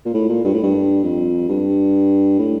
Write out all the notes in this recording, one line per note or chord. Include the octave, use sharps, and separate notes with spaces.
A#2
A2
A#2
G2
A2
G2
F2
G2
A2